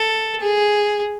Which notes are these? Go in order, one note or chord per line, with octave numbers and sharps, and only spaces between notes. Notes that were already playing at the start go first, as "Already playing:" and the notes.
Already playing: A4
G#4